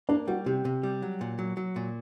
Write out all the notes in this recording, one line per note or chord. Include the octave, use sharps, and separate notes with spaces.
A#3 D4
G3 F#4
C3 G4
C3
G3
F#3
A#2
F#3
F#3
A#2